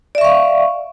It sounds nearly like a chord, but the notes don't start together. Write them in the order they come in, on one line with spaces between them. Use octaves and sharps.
D5 E5 C#6 F5